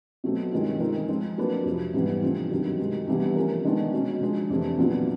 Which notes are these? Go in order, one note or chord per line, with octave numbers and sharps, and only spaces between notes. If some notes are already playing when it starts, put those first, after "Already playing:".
B2 F#3 A3 C4
G2 D#3 G#3 C#4 F4
D#3 G#3 C4 F4 A#4
F3 G#3 C4 F4
F#3 A#3 D4 F#4 B4
F2 C3 F3
G#2 E3 G3 B3
D3 F3 A3 C4 F4
G2 D#3 F#3
C3 D#3 G#3
C3 E3 G3 B3 D4
F3 A3 C#4 F4 A#4
D#3 G#3 B3 D4
B2 G#3 C#4
D3 F3 G#3
F2 C3 E3 A3 D4
A#2 F#3 B3 D4 F4